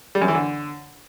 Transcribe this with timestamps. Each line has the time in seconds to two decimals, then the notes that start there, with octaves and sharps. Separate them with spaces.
0.15 G3
0.22 F#2
0.28 E3
0.35 D3